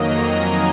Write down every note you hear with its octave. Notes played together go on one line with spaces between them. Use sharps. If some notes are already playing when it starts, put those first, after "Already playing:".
Already playing: F2 D#3 F#3 A#3 D#5 A#5
G#5